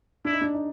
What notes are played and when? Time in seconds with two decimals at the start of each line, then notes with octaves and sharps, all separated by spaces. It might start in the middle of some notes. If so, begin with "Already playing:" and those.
0.25 D4 E4
0.33 D#4
0.41 D4
0.54 D#4